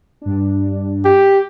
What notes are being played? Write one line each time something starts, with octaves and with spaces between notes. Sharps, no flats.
G2 D4
G4